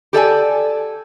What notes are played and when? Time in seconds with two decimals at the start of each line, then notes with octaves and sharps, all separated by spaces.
0.13 G4 A4 D5 G#5